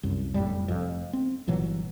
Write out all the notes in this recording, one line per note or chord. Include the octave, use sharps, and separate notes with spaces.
C2 F#2
F#1 F2 A2 G3
F1 F2
C4
G1 A#2 E3 F#3